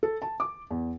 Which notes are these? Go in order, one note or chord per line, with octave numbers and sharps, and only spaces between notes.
A4
A5
D6
E2